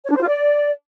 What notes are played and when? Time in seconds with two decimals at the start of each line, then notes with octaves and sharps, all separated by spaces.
0.06 C#5
0.11 D4
0.17 C5
0.22 F4
0.27 D5